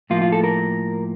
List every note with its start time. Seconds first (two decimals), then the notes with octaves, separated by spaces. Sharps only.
0.10 A2 F3 A#3 F4
0.22 F4
0.32 A4
0.44 A#4